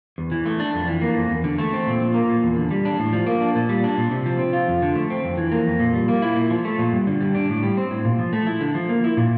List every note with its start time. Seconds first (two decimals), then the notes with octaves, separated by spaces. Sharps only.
0.18 E2
0.32 E3
0.46 A3
0.60 D4
0.74 F2
0.88 E3
1.02 A#3
1.17 F2
1.30 E2
1.44 D3
1.59 A3
1.73 C4
1.87 A#2
2.00 F3
2.14 A#3
2.29 A#2
2.43 E2
2.56 D3
2.71 G3
2.85 D4
2.99 A2
3.12 F3
3.27 A#3
3.41 D4
3.55 A#2
3.69 G3
3.84 D4
3.97 A#2
4.11 C3
4.26 F3
4.39 C4
4.53 F4
4.68 F2
4.82 D3
4.95 A3
5.10 C4
5.24 F2
5.37 E3
5.52 A#3
5.67 F2
5.80 A#2
5.94 G3
6.08 A#3
6.22 E4
6.36 A#2
6.51 F3
6.65 A3
6.79 A#2
6.93 G2
7.07 D3
7.21 G3
7.35 D4
7.49 A2
7.63 G3
7.77 C4
7.90 A2
8.05 A#2
8.19 F3
8.33 A3
8.47 E4
8.61 D3
8.75 F3
8.89 A#3
9.04 E4
9.17 A#2